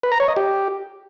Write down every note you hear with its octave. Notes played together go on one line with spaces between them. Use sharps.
B4
A#5
C#5
D#5
G4